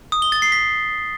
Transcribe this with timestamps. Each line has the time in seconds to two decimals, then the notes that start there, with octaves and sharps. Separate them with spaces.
0.12 D#6
0.22 G7
0.32 A6
0.42 C7
0.52 B6